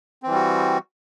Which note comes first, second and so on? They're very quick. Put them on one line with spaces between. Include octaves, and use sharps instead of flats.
C4 E3 G3 F#4